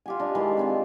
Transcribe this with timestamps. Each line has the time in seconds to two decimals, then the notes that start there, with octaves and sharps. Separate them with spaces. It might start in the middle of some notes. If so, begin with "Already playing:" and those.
0.06 F4 G4 G#5
0.20 D4 D#5
0.35 D#3 E3 G#3 C6
0.57 C4 F4 A5